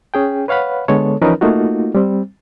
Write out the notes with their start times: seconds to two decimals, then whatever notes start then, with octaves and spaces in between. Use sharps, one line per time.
0.14 C#4 G#4 G5
0.48 B4 C#5 F5 F#5 B5
0.88 D3 G#3 B3 A4 C#5
1.22 E3 F3 C#4 D#4 A#4 B4
1.41 A3 A#3 D#4 F4 F#4
1.95 G3 C4